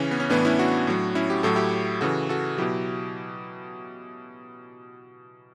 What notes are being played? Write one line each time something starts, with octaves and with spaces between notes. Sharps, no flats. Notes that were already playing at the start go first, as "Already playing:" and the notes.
Already playing: C#3 E3 C#4
B3
C#4
A2 E3 B3 D4
C#4 E4
D4 F#4
A2 F#3
C#4 E4
G4
A2 F#3 A4
E4 G4
C#3 E3 F#4 A4
F#4 A4
B2 F#3 E4 G4